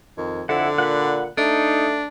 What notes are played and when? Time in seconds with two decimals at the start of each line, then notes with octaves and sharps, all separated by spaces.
0.18 F2 D#3
0.49 F2 D3 E4 F#5
0.78 A#2 F#5 B5
1.37 A3 D4 D#4